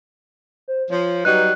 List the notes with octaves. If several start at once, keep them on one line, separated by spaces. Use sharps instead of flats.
C5
F3 C#5
F#3 G3 D#4 B4 F#6